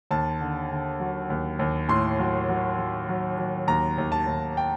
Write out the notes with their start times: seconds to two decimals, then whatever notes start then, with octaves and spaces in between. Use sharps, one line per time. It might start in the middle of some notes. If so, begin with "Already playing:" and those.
0.11 D#2 A5
0.41 D3
0.70 D3
1.00 F#3
1.30 D#2
1.59 D#2
1.89 A2 C6
2.19 F#3
2.49 F#3
2.78 F#3
3.09 F#3
3.38 F#3
3.67 D#2 A#5
3.98 D#2
4.12 A5
4.27 D#2
4.57 G5